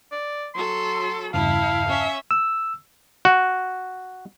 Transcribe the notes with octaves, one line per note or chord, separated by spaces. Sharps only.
D5
F#3 A4 C6
E2 G2 C#3 E4 F5 A5
C#4 E5
E6
F#4